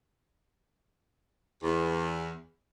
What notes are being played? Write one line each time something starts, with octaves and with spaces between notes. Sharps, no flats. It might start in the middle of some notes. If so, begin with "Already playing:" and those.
E2